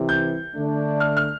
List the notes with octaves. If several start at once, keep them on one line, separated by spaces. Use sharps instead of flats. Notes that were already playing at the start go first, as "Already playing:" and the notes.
Already playing: C2 C3 E3
G6
D3 A3 D4
F6
F6